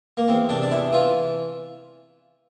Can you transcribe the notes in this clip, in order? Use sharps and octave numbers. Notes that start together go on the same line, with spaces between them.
A#3
E2 C4
C3 D4
D4
E2 E4
E3 F4